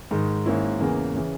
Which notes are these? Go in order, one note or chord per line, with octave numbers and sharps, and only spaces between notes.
G#2 D#3 G#3
G#2 D#3 A#3 C#4 E4
E2 C#3 E3 A#3
C#3 E3